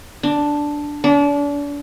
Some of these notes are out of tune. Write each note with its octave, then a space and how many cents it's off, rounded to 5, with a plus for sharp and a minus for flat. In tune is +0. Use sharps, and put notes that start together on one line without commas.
D4 +0
D4 -35